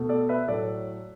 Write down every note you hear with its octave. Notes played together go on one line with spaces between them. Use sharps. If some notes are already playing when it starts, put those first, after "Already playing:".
Already playing: B2 A3
A4 D5
B4 E5
A2 F#3 A3 A4 D5